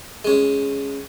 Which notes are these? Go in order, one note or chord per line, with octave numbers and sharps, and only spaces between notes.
G#3 C#4